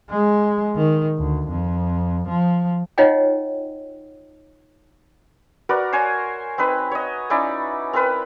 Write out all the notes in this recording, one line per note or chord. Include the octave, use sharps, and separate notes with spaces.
G#3
D#3
D2
F2
F3
D#4 F4 C#5 D#5 F#5 G5
F#4 A#4 B4 D5
C5 C#5 G#5
C4 D#4 B4
C#5 D#5
C#4 D#4 E4 D5
C4 A#4 B4